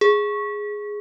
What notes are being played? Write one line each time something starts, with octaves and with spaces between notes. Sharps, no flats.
G#4